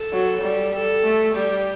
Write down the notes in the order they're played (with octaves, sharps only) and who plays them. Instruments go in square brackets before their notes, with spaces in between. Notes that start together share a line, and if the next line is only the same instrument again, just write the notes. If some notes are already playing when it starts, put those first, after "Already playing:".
Already playing: [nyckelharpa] A4
[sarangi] F#3
G3
[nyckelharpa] A4
[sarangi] A3
[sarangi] G3 [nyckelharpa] G4